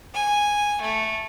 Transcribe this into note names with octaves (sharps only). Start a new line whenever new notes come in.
G#5
A3